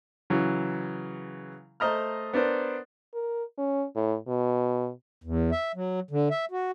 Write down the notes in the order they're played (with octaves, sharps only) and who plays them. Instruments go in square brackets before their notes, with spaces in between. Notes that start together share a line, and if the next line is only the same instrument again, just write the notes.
[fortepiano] C#3 E3 F#3
A3 C5 D#5 A#5 F6
B3 D4 A#4 C5
[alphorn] A#4
C#4
A2
B2
[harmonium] E2
E5
F#3
D3
E5
F#4